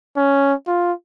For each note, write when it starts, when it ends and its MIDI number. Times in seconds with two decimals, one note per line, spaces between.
0.17 0.53 61
0.67 0.92 65